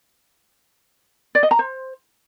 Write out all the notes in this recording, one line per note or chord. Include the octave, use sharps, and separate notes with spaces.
D5
D#5
A#5
C5